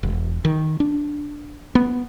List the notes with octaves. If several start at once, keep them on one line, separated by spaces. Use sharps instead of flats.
E1
D#3
D4
B3